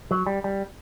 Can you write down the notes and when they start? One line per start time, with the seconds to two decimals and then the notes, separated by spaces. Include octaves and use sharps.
0.11 F#3
0.26 G3
0.44 G3